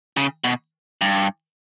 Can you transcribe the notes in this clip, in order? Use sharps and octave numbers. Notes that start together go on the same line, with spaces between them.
C#3
B2
G2